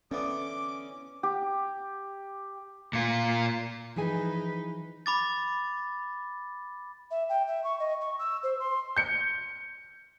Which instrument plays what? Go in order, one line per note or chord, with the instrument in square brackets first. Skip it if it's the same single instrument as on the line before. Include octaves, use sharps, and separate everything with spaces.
[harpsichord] D3 E3 B3 [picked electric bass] C#4 [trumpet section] D6
[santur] G4
[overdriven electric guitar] A#2 F4
[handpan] E3 F3 [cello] D#4 B4 [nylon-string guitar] E4 G#4 G#5
[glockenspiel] B5 D6 A6
[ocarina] E5
G5
E5
C#6
D#5
C#6
E6
C5
C6
[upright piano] G6 C#7